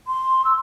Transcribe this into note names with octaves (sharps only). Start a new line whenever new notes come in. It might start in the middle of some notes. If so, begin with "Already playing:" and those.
C6
E6